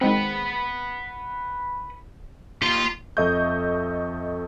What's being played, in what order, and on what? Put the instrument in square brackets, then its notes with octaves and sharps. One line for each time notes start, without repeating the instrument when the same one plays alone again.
[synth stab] D#3 G#3 C4 [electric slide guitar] B4 F#5
[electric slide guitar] A#3 G4 [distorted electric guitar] F4 C6
[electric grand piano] F2 A4 D#5 E5 C#6 G6